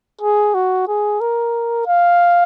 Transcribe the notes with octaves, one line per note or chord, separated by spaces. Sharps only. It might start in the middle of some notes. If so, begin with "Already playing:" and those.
G#4
F#4
G#4
A#4
F5